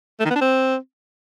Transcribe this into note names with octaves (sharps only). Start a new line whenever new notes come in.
A3
D#3
B3
D4
C4